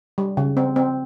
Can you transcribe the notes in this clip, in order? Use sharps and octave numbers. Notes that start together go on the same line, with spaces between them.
G3
C#3
C4
C4